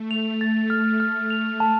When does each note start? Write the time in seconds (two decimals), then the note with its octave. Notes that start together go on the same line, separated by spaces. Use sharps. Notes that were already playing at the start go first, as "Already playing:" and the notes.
Already playing: A3
0.11 F7
0.41 A6
0.70 F6
1.00 F6
1.30 F7
1.60 A5